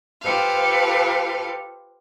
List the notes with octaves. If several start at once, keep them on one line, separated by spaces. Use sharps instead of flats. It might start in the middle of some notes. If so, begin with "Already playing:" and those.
F4 G4 A4 B4 C5 F5